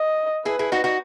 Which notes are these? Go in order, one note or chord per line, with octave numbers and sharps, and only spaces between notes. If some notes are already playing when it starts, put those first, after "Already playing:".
Already playing: D#5
E4 G#4 B4
E4 G#4
D#4 F#4
D#4 F#4